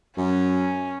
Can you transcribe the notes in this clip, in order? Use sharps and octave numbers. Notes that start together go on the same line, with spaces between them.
F#2 C#4